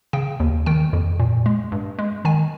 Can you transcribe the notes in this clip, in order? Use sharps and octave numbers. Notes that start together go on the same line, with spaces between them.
C#3 G5
D#2
D#3 G5
F2
A#2
G#3
G2
G#3
D#3 G#5